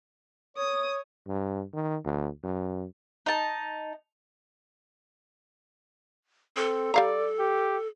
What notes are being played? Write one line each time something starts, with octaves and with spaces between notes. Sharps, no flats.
C#5 D#6
G2
D#3
D2
F#2
D#4 A5
C4 A4
G3 D5 F5 A#5
G4